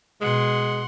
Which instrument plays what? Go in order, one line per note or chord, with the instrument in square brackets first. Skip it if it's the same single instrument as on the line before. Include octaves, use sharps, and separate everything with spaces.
[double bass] B2 [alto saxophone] G#3 [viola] F#5 C6